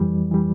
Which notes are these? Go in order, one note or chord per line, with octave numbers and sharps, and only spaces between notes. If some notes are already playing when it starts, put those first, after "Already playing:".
Already playing: F2 E3 G3
E3 G3